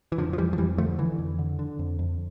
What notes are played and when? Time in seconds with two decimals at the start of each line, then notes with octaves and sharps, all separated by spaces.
0.12 E3
0.18 F2 D3 F3
0.33 F3
0.38 F2 E3 G3
0.53 F3
0.58 F2 E3 G3
0.78 D3 F3 A3
0.98 D3 E3
1.19 F2
1.39 D3
1.59 D3
1.79 F2
1.99 F2